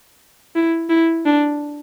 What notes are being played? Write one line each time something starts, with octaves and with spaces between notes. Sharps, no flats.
E4
E4
D4